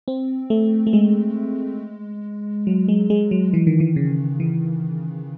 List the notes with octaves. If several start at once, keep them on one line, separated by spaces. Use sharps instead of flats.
C4
A3
A3
G#3
F#3
G#3
G#3
F#3
E3
D#3
E3
C#3
E3